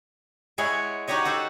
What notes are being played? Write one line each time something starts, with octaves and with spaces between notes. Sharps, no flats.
G#3 E4 G#4 C#5 F#5
D#4 F#4 G4 C#5 D#5
F#4 A4 C5